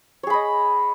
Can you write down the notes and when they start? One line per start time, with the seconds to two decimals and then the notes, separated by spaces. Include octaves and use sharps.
0.23 C#5
0.27 G#4
0.30 B5
0.33 D#5